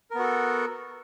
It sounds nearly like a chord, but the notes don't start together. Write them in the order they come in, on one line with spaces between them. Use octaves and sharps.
A#4 B3 F#4 A4